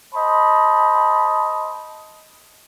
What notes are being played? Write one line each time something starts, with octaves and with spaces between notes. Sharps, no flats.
C5 D#5 A5 B5